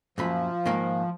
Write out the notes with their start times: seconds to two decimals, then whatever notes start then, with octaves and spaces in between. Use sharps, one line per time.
0.18 F#2 A#2 F3 B5
0.66 G#2 D#3 A#3